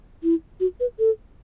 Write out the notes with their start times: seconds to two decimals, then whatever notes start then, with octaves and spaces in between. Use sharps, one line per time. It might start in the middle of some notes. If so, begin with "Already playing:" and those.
0.23 E4
0.60 F#4
0.80 B4
0.99 A4